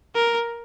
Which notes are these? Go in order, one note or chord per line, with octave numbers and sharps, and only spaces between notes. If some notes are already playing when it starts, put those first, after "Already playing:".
A#4